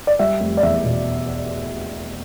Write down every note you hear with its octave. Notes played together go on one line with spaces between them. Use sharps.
D5
G3 E5
F1
D5
E2 E5
B2